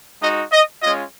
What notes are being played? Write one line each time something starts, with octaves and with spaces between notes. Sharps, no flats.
G#3 D#4 F#4 D#5
D#5
G#3 C#4 F4 D#5